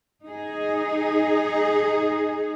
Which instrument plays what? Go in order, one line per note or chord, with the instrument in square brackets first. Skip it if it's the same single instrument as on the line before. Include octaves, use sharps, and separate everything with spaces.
[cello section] D#4 G#4